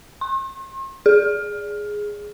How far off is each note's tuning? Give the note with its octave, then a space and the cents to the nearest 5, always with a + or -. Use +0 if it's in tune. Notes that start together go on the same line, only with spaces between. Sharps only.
C6 +45
G#4 +0